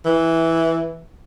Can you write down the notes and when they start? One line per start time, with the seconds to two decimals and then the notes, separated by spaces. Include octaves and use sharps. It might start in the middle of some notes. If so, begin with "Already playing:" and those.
0.05 E3